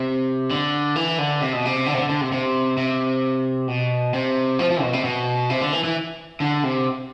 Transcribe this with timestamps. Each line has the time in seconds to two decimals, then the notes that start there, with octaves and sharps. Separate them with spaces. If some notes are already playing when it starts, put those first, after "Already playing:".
Already playing: C3
0.50 D3
0.96 E3
1.18 D3
1.41 C3
1.53 B2
1.65 C3
1.86 D3
1.94 C3
1.98 D3
2.09 D3
2.21 C3
2.32 C3
2.77 C3
3.68 B2
4.13 C3
4.59 F3
4.70 F3
4.82 B2
4.93 C3
5.04 B2
5.50 C3
5.61 D3
5.72 E3
5.84 E3
6.40 D3
6.63 C3